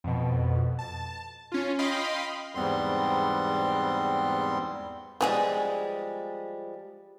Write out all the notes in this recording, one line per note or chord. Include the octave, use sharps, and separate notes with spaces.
F2 B2
A5
C#4 F4
D#5 F5 G5 B5 C6
E2 G#2 G3 B3 C4 C6
F3 G3 G#3 B3 G#4